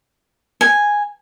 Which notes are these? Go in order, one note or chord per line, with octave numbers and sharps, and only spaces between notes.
G#5